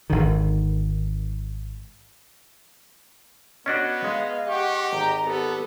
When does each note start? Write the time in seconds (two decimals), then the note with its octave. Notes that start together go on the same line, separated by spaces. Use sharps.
0.10 G#1 D3 D#3
3.66 B3 C#4 D4 F#4 D#5
4.04 G#3 F5
4.48 G4 F#5 C#6
4.93 G#1 A#5
5.25 B3 G4 A4